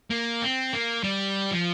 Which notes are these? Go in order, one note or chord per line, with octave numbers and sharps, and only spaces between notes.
A#3
C4
A#3
G3
F3